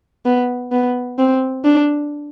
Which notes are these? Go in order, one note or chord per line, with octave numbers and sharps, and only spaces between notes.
B3
B3
C4
D4